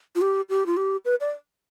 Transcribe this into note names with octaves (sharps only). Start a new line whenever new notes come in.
F4
G4
G4
F4
G4
B4
D5